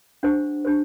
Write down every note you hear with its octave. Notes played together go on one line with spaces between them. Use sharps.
D4 G4 C5 F#5
D4 G4 C5